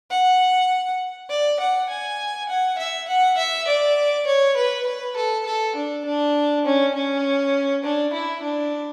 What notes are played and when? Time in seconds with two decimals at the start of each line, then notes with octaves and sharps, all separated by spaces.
0.10 F#5
1.30 D5
1.59 F#5
1.89 G#5
2.49 F#5
2.78 E5
3.08 F#5
3.37 E5
3.67 D5
4.26 C#5
4.56 B4
4.86 B4
5.16 A4
5.46 A4
5.75 D4
6.05 D4
6.65 C#4
6.94 C#4
7.84 D4
8.13 E4
8.42 D4